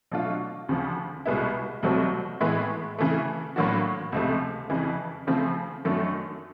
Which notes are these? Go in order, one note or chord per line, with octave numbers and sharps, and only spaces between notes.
B2 F#3 A3 D4 F4
D2 C#3 F3
C2 B2 G#3 B3 E4
C2 B2 F#3 A3 C4
A2 E3 G#3 B3 E4
C#3 E3 A3
A2 F#3 A#3 D4 F#4
C#2 C3 F3 A3
F2 C#3 E3
C#3 F3 A3 C4
F#2 D#3 F#3 A3 D4